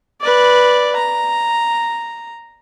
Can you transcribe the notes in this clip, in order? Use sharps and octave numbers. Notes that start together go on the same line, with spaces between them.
B4 D5
A#5